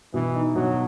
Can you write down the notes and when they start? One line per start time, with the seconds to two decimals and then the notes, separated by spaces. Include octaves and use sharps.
0.14 B2 E3
0.35 D#4
0.55 B2 F#3